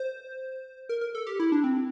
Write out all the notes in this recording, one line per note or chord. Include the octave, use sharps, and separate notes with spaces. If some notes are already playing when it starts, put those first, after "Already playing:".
Already playing: C5
A#4
A#4
A4
G4
E4
D4
C4